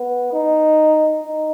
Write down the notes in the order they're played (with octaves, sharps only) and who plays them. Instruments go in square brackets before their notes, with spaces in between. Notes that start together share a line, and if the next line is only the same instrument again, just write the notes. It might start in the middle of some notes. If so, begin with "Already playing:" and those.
Already playing: [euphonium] B3
D#4
D#4